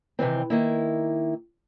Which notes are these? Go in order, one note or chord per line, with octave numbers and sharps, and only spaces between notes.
C3 D#3 E3 C4
D#3 A#3 E4